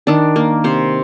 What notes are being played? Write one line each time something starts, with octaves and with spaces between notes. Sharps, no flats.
D#3 D4
A#3
C3 C5